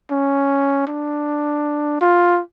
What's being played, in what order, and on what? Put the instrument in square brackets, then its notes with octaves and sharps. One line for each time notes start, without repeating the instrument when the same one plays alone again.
[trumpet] C#4
D4
F4